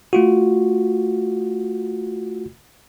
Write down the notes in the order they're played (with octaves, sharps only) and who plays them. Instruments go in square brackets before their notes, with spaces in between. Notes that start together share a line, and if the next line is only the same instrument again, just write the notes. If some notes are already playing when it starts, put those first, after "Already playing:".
[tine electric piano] A3 F4 F#4